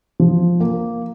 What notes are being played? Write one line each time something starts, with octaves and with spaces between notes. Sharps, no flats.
F3
A#3